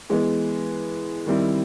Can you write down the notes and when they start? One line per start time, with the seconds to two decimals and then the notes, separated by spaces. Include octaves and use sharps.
0.10 E3 G#3 B3
1.27 D#3 G3 C4 E4